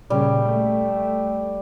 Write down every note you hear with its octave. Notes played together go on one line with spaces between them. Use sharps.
A#2 C#3 G3
A3